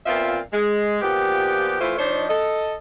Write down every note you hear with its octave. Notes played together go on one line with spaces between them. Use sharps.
A#2 B3 C4 F4 E5 F5
G#3
A#2 F3 B3 G4
E3 A3 E4 F4 C5
F3 D4 D#4 C5 C#5 D#5
A4 D#5